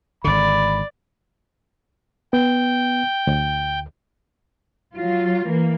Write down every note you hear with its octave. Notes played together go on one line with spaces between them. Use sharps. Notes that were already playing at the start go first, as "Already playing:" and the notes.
G#1 D3 D5 B5
B3 G5
D2
F#3 F4
E3 A#3